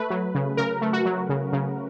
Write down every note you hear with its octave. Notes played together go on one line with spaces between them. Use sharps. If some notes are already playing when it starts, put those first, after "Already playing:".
Already playing: A3 B4
F#3
C#3
C#3 A#4
A3
F#4
F#3
C#3
C#3